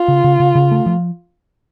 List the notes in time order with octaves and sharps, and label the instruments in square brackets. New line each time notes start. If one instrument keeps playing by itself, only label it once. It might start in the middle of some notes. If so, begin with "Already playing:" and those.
Already playing: [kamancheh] F4
[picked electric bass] C#3
C#3
C#3
C#3
A3
F3